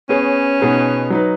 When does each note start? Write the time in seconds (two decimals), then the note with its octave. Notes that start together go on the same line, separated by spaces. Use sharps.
0.09 B3 C#4 G#4 C#5
0.60 B2 B3 D#4 G#4 B4
1.10 F#3 D#4 B4